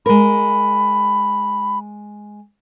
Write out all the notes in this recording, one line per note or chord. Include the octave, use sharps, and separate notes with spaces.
G#3 A#4 B5